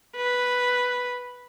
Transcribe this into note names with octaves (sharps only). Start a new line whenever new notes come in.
B4